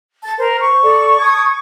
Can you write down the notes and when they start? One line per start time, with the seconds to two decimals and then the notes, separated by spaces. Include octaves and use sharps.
0.22 A5
0.39 A#4 C5
0.61 C#6
0.83 A4 D5
1.20 A5 D#6 G#6